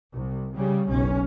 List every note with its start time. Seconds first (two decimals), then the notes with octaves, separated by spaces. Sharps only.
0.14 C2
0.55 C#3 G3
0.89 F#1 B1 C#4